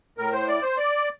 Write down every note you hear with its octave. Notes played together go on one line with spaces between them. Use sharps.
A2 A#4
C5
D5
C5
D5